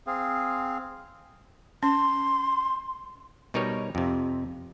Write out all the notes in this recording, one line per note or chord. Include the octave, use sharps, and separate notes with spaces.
C4 G#4 F5
C#4 C6
B2 G3 D#4 A#4 B4 C#5
F2 C3